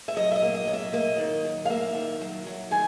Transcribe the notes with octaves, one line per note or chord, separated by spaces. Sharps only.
E5
F#3 D#5
E5
D#5
A#3
D#5
F#3
E5
A#3 D#5
D#3
F#3
F5
A#3 E5
D#3
F#3
F#3
D#3 G#5